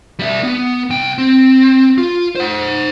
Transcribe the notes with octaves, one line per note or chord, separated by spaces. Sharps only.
G3 E5
B3
C2 G5
C4
F4
C5 F#5